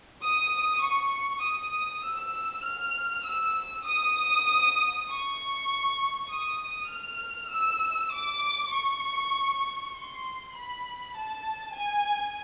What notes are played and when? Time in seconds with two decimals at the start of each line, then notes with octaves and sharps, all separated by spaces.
0.23 D#6
0.84 C#6
1.44 D#6
2.06 E6
2.65 F6
3.27 E6
3.87 D#6
5.08 C#6
6.30 D#6
6.90 F6
7.51 E6
8.12 D6
8.73 C#6
9.94 C6
10.55 B5
11.16 A5
11.76 G#5